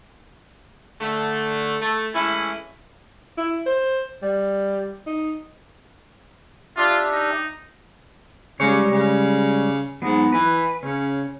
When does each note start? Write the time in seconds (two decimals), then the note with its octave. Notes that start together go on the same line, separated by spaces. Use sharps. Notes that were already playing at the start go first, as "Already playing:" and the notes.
1.01 D3 A3
1.81 A3
2.14 E3 G#3 A3 C#4 E4
3.38 E4
3.66 C5
4.22 G3
5.06 D#4
6.77 D4 F4 G4 E5
7.11 D#4
8.60 C#3 G3 G#3 C#5
8.91 C#3
10.02 G#2 F#3 B3 D#4
10.33 E3 B4
10.83 C#3 C#4